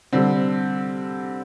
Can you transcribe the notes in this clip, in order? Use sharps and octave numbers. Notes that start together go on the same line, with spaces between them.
D3 G3 C4